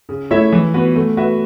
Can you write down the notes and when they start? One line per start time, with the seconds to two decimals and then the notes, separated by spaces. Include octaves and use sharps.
0.09 C#3
0.31 A3 E4 C#5 E5
0.52 E3
0.74 B3 F#4 B4
0.96 A3
1.17 F#4 B4 E5